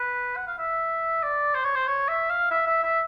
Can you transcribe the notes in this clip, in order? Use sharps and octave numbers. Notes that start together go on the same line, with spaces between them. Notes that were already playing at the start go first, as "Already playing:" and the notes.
Already playing: B4
F#5
F5
E5
D5
C5
C#5
C5
C#5
E5
F5
E5
E5
E5